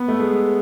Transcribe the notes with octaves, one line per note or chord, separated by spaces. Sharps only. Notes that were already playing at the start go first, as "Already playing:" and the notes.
Already playing: B3
A3
G#3